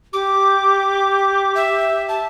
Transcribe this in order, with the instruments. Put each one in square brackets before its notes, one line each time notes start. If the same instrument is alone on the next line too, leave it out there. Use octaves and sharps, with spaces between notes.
[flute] G4 [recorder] D6
[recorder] E5
A5